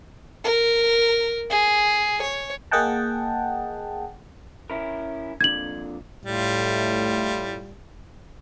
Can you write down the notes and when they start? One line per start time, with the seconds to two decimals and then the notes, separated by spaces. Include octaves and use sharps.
0.44 A#4
1.50 G#4
2.22 C#5
2.71 A#3 G#4 D#5 F#5 G5 A5
4.70 C#4 E4 A#4
5.41 F2 A#2 D3 G#6 F#7
6.25 A2 G3 F4